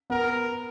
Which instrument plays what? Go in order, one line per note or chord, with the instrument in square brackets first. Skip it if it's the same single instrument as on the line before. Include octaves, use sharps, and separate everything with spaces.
[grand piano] B3 [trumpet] A#4